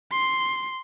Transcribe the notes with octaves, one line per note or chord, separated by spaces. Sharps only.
C6